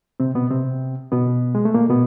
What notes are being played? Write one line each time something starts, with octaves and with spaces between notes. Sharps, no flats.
C3 C4
B2 B3
C3 C4
B2 B3
G#3
A3
A#2 A#3
B2 B3